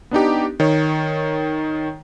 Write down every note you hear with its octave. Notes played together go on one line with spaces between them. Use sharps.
B3 D4 D#4 G4
D#3 C#5